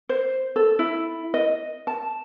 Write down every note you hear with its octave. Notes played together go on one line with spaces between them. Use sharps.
C5
A4
E4
D#5
A5